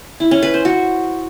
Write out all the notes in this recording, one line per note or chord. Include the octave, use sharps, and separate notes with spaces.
E4
C#4
B4
C5
F#4